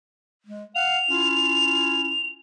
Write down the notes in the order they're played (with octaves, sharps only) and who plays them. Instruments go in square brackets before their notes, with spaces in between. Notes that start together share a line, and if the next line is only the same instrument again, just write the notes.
[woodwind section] G#3
[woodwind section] F5 F#5 [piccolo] F7
[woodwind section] C#4 E4 F4